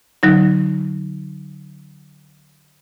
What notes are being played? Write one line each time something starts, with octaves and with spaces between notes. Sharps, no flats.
D3 F#3 D#4